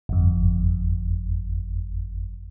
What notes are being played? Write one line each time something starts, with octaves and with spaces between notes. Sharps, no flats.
G1 F2